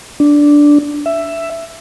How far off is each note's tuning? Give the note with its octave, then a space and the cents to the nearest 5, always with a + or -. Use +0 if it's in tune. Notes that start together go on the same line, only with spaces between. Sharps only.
D4 -5
E5 +10